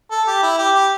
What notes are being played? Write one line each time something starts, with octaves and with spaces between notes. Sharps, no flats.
A4
G4
E4
G4
G4